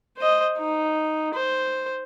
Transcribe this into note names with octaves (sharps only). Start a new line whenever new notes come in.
C5 D#5
D#4
C5